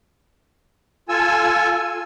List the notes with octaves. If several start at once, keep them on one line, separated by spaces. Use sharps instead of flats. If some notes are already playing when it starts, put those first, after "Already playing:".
F4 A4 G#5 E6